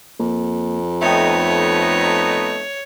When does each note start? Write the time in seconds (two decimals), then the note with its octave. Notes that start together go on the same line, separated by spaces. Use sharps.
0.20 F2 A#3
1.02 A3 B3 D#4 C#5 E5 G5